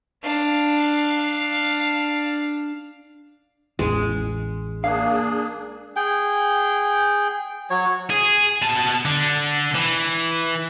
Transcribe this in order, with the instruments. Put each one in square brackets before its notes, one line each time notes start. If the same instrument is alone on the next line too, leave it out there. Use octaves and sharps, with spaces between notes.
[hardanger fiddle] D4 F5
[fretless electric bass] A1 E2 [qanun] G#3
[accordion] A#3 D4 G#4 [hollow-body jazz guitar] F5
[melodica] G#4 G5
F#3 C#5
[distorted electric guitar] G#4
B2 A5
D3
E3